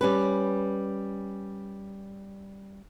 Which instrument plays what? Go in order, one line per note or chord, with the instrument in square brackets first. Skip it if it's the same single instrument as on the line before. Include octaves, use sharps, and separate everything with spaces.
[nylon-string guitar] G3 C#4 B4